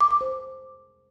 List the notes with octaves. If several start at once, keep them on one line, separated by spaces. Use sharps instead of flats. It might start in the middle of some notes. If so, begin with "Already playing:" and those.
D6
D6
C5